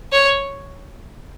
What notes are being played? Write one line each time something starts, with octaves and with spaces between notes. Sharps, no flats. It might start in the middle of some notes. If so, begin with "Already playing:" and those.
C#5